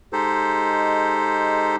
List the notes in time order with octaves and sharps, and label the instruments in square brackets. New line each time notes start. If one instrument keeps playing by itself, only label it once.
[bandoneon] G#3 D#4 G4 A4 C5